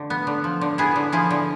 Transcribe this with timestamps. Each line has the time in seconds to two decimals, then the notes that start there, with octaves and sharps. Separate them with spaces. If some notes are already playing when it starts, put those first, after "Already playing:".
Already playing: D3 A3
0.10 B3
0.27 D3
0.44 F3
0.61 D3
0.78 B3 E4 G#4
0.96 D3
1.12 F3 E4 G#4
1.30 D3